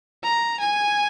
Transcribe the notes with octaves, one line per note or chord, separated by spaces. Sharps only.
A#5
G#5